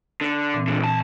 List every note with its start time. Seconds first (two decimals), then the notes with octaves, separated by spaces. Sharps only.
0.21 D3
0.54 A#2 E3 C4
0.68 C#2 D3
0.80 B1 A5